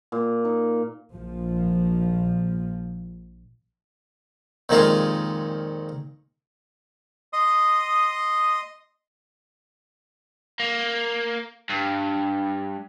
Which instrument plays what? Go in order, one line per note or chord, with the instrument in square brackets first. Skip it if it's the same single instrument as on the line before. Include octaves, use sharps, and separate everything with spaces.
[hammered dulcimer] A#2
D#4
[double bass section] A#1 F3
[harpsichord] F2 A#2 D#3 G#3 F4
[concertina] D#5 C6 D#6
[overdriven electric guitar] A#3
G2